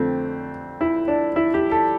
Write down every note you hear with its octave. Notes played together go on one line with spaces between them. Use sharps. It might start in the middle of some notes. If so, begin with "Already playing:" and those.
Already playing: F2 D3 A3 C4
E4
D4
E4
G4
A4